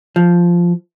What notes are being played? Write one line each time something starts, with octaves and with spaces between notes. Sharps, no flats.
F3